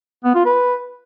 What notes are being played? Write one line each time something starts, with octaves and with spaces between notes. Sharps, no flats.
B3
F4
B4